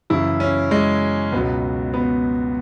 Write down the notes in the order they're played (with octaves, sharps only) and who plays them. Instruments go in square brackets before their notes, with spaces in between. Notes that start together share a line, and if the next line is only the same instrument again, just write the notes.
[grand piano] F#2 C#3 E3 E4
C#4
G#3
C#2 B2 F#3 B3
B3